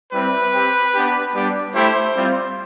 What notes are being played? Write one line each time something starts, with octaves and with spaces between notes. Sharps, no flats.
G3 C4 E4 B4
C4 G4
B3 D4 G4
G3 B3 D4 G4
A3 E4 G4 C5
G3 C4 F4